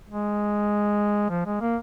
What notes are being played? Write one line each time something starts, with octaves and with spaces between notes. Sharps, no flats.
G#3
F3
G#3
A#3